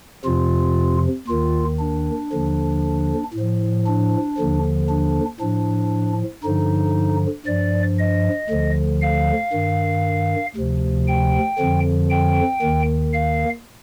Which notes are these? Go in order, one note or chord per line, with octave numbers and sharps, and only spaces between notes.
F2 C3 F3 F4
D#2 D#3 F4
D4
D#2 D3 F3
A2
F3
D4
D#2 D3 F3
D4
A2 F3 D4
G2 D3 F3 D#4
G2 F3 D5
D#5
D2 D3 F3
F5
G2 D#3
D2 C3 F3
G5
F2 D3 F3
G5
D#2 D#3
F5